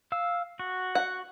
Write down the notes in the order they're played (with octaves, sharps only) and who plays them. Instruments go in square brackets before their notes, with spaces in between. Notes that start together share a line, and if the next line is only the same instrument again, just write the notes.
[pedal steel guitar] F5 E6
F#4
[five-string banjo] F#5